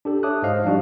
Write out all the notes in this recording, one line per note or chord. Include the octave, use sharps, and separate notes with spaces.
D4 G4 A4
C#5 E5 A5 D6 D#6 F#6
G#2 C5 D#5 F5
F3 G3 D4 D#4 F#4